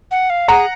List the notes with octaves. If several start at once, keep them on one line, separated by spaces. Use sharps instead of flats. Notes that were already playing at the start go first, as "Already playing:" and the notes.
F#5
F5
G#4 F#5 A#5